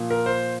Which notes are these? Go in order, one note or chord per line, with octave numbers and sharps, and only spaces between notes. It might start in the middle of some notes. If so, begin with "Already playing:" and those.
Already playing: A#2 F3
A#4
C5